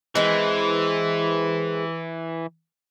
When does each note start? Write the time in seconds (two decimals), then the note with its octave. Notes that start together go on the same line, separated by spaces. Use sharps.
0.15 E3 G#3 C4